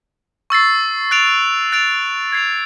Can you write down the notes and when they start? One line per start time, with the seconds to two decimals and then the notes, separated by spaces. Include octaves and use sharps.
0.50 C#6 E6 A6 C7
1.11 F#6 A6 D7 F7
1.72 F#6 A6 D7 F7
2.32 G#6 C7 F7